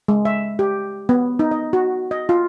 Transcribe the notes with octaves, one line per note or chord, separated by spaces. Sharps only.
G#3
E5
G4
B3
D#4
D#5
F#4
D#5
F4